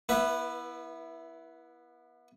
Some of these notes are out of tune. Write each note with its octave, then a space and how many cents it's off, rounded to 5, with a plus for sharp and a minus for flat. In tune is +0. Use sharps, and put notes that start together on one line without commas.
B3 -30 E4 +0 B4 +0